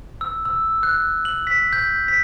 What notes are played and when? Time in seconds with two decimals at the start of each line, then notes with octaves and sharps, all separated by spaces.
0.21 E6
0.45 E6
0.83 F#6
1.25 F#7
1.47 B6
1.73 G6
2.08 B6